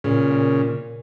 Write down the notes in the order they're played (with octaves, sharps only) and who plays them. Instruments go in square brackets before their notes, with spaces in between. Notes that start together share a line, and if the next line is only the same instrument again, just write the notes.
[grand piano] A#2 [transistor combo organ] C#3
[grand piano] A#2